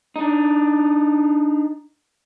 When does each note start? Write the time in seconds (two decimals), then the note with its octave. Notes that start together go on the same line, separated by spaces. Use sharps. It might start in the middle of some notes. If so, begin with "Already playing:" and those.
0.16 D4 D#4